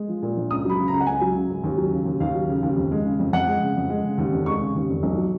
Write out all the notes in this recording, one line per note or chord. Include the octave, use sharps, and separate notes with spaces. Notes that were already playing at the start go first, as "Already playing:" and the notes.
Already playing: G#3
F3
A#2
A#1
C#2 D#6
F#3 B5
C#3
C#2 A#5
F#5
C#2 G#5
F#3
C#3
C#2
D#2
F#3
C#3
D#2
D#2 F5
F#3
C#3
D#2
F2
G#3
C#3
F2
F2 F#5
G#3
C#3
F2
G#3
C#3
D#2
F1
G#3 C#6
C#3
D#2
F1
B1
F#3